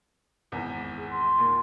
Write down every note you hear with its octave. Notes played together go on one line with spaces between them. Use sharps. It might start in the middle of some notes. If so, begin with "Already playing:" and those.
G#1 E2
G#4
C6
D#2 A#2